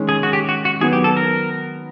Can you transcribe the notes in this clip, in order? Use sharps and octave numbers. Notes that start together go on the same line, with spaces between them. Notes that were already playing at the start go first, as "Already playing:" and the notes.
Already playing: D#3 G#3 C#4
G#4
F#4
G4
F#4
F#4
D#3 F#3 B3 G#4
G4
A4
A#4